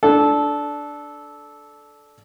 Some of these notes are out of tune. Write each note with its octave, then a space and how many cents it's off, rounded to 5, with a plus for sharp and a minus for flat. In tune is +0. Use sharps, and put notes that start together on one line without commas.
D4 +0 A4 -15